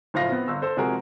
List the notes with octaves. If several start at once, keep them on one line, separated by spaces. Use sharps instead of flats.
F#1 A2 F3 F4 F5 A#6
B3 C4
G1 E6
A4 C5
C3 F3 G#3 F#4 G#4 A#4